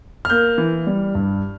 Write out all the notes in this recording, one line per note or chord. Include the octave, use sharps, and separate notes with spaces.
F6
A#3 G6
E3
G3
G2